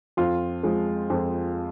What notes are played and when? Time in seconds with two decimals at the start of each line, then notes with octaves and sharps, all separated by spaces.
0.17 F2 F4
0.63 F3 G#3
1.10 F2